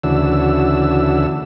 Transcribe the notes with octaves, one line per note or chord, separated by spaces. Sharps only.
D2 C#3 E3 D4 F#4 E6